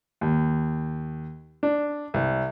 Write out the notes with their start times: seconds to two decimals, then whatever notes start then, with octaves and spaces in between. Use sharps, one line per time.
0.21 D#2
1.63 D4
2.14 C2